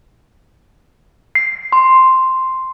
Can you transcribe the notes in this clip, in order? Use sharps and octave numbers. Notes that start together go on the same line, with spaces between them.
C7
C6